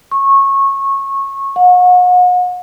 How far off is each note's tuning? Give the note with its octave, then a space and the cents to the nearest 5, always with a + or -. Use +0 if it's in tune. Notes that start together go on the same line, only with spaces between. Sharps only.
C#6 -20
F#5 -40